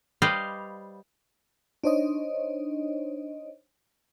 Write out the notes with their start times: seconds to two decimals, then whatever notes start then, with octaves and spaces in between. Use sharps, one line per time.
0.22 G3 B4 C5 D5 D#5 F5
1.84 D4 D#4 C5 C#5 D#5